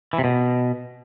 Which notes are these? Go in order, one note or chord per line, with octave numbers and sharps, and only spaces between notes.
E3
C3
B2